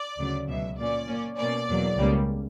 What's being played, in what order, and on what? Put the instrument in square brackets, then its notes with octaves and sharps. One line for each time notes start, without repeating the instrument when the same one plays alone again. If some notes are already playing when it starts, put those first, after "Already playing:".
Already playing: [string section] D5
D2 C#3 F#3
C#2 B2 F#3 E5
A#2 A#3 C#4 D5
A#2 A#3 C#4
B2 A#3 C#4 D5
E2 B2 F#3 A#3
C#2 C#3 G3 A#3